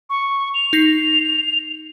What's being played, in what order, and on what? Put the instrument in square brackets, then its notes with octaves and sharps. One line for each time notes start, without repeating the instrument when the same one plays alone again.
[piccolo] C#6
F7
[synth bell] D#4 A#6 C7